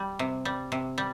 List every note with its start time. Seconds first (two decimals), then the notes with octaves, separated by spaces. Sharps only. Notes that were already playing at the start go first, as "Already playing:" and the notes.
Already playing: G3
0.19 C3
0.45 G3
0.72 C3
0.98 G3